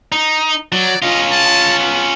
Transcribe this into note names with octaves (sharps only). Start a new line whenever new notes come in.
D#4
F#3 D5
C#4 F4 D#5
A5
B3